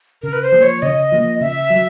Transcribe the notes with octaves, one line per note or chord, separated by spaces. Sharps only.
C#3 A#4
B4
C5
F3 A#3
C#5
C#3 D#5
F3 A#3
C#3 E5
F#3